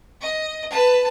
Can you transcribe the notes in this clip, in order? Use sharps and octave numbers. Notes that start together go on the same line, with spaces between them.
D#5
B4 A5